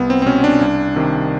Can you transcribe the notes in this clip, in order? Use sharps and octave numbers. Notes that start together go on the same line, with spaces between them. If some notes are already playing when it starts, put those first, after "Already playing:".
Already playing: C2 B3
C4
C4
B2 C#4
D4
C2
C3 D#3